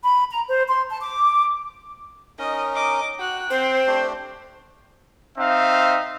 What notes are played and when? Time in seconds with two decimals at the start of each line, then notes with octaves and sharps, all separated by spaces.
0.03 B5
0.31 A#5
0.47 C5
0.68 C6
0.90 A5
1.01 D6
2.39 C#4 D#4 A#4 D#5
2.75 D#5 D6
3.19 F#4 G5 F#6
3.50 C4 C5
3.87 A3 D4 G4
5.38 C4 D#4 E5 F5